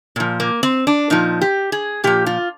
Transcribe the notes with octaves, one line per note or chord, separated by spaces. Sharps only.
A#2 F3
A#3
C4
D4
A#2 F3 D#4
G4
G#4
A#2 F3 G4
F4